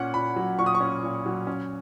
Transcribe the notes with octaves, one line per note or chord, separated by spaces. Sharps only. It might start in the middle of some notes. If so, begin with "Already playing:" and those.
Already playing: A#2 C#4 F#5
A#2 B5
F#3
A#2 C#6
D#6
C#6
C#4
A#2
F#3
C#4